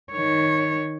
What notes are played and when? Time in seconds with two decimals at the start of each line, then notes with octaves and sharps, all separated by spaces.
0.12 D#3 C#5